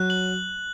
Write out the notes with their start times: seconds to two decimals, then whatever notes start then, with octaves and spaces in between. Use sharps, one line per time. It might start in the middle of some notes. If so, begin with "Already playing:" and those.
Already playing: F#3 F#6
0.10 F#7